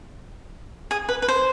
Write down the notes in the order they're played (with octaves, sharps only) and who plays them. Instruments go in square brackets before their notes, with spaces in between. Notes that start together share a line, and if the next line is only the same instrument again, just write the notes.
[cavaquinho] G#4
B4
B4
C5